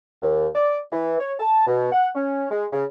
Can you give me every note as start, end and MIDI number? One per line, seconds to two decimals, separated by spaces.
0.22 0.48 39
0.55 0.80 74
0.92 1.18 52
1.20 1.34 73
1.40 1.65 81
1.67 1.92 47
1.92 2.08 78
2.15 2.47 61
2.51 2.65 56
2.73 2.85 49